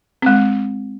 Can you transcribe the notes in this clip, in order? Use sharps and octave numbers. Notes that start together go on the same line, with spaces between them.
G#3 C4